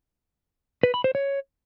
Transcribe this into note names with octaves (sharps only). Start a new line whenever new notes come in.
B4
B5
C5
C#5